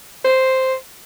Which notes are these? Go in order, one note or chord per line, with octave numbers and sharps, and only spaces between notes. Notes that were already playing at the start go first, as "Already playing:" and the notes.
C5